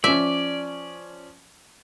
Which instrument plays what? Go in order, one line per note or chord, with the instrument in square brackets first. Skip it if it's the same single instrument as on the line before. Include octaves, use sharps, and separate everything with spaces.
[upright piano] F3 C#4 [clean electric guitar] D5 [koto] E5